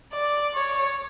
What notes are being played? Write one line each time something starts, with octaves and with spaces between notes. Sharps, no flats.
D5
C#5